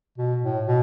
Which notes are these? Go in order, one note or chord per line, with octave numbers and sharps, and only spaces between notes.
B2
A2
B2